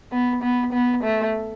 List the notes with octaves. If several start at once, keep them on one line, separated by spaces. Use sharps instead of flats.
B3
B3
B3
A3